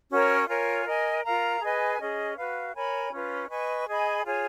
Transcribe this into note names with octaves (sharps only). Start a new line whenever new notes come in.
C#4 F#4 A#4 C#5
F4 A#4 C#5 G#5
A#4 D#5 G#5
F4 A#4 F5 A#5
G#4 B4 D#5 G#5
C#4 G#4 D#5
F#4 B4 F5
A#4 C#5 G#5 B5
C#4 F4 B4
B4 D#5 G#5 C#6
G#4 D#5 G#5 B5
F4 G#4 C#5 G#5